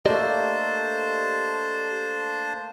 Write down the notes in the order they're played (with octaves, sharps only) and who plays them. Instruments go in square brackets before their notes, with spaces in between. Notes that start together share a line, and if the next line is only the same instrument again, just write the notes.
[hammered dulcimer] A3 A#3 [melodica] D4 C5 A5 [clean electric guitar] G4 D5 D#5